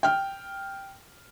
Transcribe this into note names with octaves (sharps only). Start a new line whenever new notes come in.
G5 F6